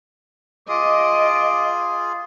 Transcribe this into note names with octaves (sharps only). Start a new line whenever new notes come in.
F4 G#4 D#5 D6